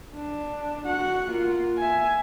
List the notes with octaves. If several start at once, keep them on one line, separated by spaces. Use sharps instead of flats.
D4
F#4 F#5
A#3 F4
E5 G#5